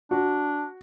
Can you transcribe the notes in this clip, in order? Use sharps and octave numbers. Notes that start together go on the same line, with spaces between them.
D4 F#4